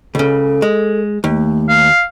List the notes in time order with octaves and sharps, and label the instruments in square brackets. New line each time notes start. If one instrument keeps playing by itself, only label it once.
[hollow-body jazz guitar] C#2 C#3 [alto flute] A4
[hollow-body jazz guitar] G#3
[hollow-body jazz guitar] D#2 [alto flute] A3
[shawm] F5